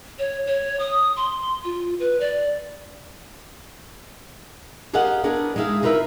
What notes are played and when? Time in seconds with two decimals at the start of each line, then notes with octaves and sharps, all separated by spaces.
0.19 C#5
0.47 C#5
0.79 D#6
1.17 C6
1.64 F4
2.00 B4
2.20 D5
4.93 G4 G#4 A#4 D#5 F5 F#5
5.24 B3 D4 G#4 A#4
5.56 G#3 D#4 G#4 E5 F5
5.83 D#4 F4 A#4 B4 E5